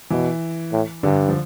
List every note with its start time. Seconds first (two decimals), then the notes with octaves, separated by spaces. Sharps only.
0.10 B2 E3
0.72 A2
1.03 G2 D3
1.28 F3